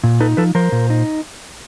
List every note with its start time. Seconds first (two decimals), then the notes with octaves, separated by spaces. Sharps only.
0.04 A#2
0.20 D#4 A4 B4
0.37 F3 A4 B4
0.55 F3 A#4 C5
0.72 A#2
0.90 D#4